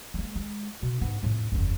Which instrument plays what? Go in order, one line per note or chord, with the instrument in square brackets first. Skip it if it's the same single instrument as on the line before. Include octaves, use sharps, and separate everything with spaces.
[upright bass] G#3 A#3
G#3
B2
G#2 B3
F2 A2
F#1 E2